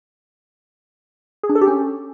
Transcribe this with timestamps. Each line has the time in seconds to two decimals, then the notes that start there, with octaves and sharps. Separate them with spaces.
1.43 G#4
1.49 D4
1.55 A4
1.61 G4
1.67 C#4